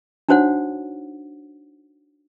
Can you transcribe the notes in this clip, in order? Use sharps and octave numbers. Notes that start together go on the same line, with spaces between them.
D4 D#4 F#4 C5 C#5 F#5